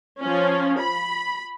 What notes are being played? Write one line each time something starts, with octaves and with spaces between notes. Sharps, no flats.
F3 C#4
B5